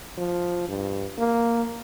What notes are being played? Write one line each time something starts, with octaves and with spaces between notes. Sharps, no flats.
F3
G2
A#3